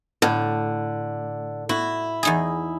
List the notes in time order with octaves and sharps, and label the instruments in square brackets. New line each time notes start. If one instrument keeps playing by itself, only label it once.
[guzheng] A2 [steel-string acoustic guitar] D3
[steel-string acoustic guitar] E4 [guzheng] F#4
[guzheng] E2 D#4 G#4